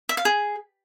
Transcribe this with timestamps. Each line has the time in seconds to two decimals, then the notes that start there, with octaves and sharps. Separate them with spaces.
0.09 E5
0.17 F5
0.25 G#4